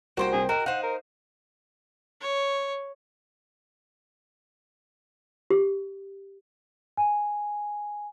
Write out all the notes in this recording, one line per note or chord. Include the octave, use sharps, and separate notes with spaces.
C2 A#3 F#4 C5 F#5 G5
C2 C3 G#4
F#4 A#4 D#5 G5
D#4 C5 F5 F#5
A#4
C#5
G4
G#5